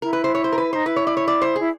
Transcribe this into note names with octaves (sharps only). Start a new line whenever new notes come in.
E4 A#4
B4
C5
C#5
C5
A#4
B4
D#4 C5
E4 B4
C#5
D5
C#5
D5
C5
E4 G#4